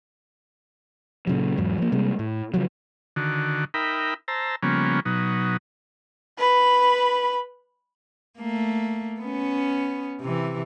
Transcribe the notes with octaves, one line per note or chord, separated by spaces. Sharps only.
A#2 C#3 F#3
E2 G#2 F#3
F3 A#3
C3 G3 G#3 A#3
A2
C#3 F3 F#3
D3 D#3 F#4
D#4 A#4 E5 G5 B5
C5 A5 A#5 E6
C#3 F3 G3 A#3 B3 C#4
B2 F#3 D#4
B4 B5
A3 A#3
B3 C#4
C3 E3